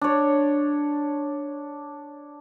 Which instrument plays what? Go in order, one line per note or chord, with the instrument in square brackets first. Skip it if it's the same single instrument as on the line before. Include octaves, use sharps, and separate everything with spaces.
[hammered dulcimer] D4 C#5